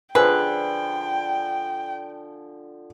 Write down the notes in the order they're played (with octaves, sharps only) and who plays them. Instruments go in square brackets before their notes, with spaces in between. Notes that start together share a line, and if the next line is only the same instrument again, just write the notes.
[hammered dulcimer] D3 F3 [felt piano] G#4 G#5 E6 [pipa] B4 [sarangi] G5